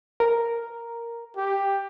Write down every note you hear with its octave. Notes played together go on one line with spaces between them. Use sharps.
A#4
G4